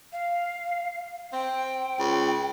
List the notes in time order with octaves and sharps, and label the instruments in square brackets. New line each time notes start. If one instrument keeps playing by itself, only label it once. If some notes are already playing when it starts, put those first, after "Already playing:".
[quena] F5
[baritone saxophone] C4 [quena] G5
[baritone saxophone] C#2